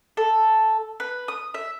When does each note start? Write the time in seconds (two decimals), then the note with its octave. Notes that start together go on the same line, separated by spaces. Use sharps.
0.17 A4
1.00 B4
1.28 D#6
1.54 E5